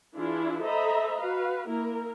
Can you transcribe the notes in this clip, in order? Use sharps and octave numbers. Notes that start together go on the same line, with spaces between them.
E3 D4 E4 F4 G#4
A4 C5 D#5 E5 A#5 B5
F#4 B4 F5
A#3 E4 A#4